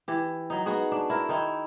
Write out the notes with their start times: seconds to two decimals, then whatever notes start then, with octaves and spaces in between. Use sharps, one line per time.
0.08 E3 G4
0.50 F#3 D#4
0.66 B3 D#4 F#4 G#4
0.92 D4
1.10 E4 A#4
1.29 D#3 D#4 E4